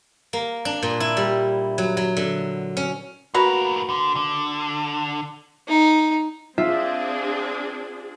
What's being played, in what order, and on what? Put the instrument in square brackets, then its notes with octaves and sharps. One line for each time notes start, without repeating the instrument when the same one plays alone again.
[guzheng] A#3
D4
A#2
E4
G3
F#3
F#3
D3
C#4
[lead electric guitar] A2 A#4 [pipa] A#3 F#4 B4
[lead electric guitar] D3
D3
[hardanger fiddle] D#4
[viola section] C4 D4 G#4 [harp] F4 E5